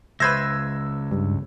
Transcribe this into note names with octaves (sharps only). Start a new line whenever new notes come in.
C#2 B4 C5 E5 E6 G#6 A#6
G2